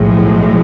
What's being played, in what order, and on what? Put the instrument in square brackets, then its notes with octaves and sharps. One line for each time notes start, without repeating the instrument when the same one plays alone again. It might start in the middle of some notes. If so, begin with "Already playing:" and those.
Already playing: [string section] B1 A2 F3 G#3